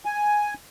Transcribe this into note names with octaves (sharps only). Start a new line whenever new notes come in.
G#5